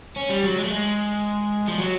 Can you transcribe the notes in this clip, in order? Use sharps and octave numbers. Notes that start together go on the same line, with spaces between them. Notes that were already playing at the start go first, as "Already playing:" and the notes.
C#4
G3
F#3
G#3
A3
G#3
F3
F#3